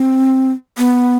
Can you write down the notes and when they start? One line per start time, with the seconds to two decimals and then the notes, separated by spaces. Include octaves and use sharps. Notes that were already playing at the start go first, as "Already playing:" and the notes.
Already playing: C4
0.78 B3